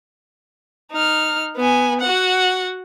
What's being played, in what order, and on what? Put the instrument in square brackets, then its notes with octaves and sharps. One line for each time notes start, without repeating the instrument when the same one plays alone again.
[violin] D#4 F6
B3 G#5
F#4 F#5